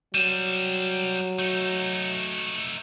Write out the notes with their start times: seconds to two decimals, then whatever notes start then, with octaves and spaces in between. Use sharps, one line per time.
0.14 F#3 G3 C4 D#7 E7
1.39 A3 D#4